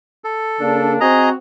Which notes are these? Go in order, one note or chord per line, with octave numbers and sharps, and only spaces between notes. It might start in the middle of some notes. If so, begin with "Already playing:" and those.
A4
C#3 A#3 D4
C4 F#4 G#4 D#5 A#5